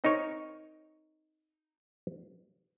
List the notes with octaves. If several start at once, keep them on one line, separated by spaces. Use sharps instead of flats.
C4 D#4 A#4 C#5